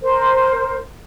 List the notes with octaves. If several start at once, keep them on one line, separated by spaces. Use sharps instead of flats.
A#4 C5